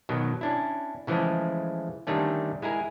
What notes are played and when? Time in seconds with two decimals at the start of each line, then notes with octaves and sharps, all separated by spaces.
0.09 B2 D#3 F#3
0.41 C#4 D4 E4
1.07 C#3 E3 F3 G#3 A3
2.07 D3 D#3 G3 A3 C#4
2.62 G#3 E4 G#4 A#4